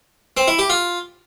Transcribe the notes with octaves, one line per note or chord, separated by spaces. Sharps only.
C4
E4
G4
F4